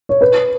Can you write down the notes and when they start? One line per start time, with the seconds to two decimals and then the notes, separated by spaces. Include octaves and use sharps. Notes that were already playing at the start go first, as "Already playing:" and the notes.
0.09 C#5
0.21 B4